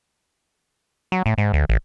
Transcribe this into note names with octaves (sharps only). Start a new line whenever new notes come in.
F#3
A2
G#2
D2
A1